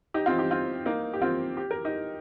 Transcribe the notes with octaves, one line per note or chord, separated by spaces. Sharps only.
D#4 G4
C4 F4
D#4 G4
C4 F4
A#3 D#4
G4
C4 F4
G4
A#4
D#4 G4